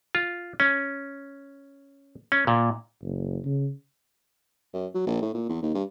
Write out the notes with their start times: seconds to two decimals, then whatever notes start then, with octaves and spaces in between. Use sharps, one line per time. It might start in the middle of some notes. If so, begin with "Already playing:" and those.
0.15 F4
0.60 C#4
2.32 C#4
2.47 A#2
3.02 F#1
3.45 C#3
4.73 F#2
4.94 F#3
5.07 A#1
5.21 A2
5.34 A#2
5.49 E2
5.62 D#2
5.74 G2